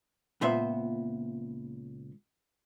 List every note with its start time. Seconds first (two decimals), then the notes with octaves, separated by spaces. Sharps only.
0.41 C#2 A#2 B3 C5 E5